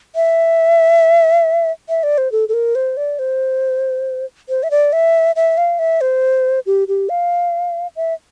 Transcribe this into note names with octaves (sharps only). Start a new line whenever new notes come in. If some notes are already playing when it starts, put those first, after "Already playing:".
E5
E5
D5
C5
A4
A4
A#4
C5
D5
C5
C5
E5
D5
E5
E5
F5
E5
C5
G4
G4
F5
E5